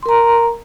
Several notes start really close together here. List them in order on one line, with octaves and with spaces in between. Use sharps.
C6 A#4 A#5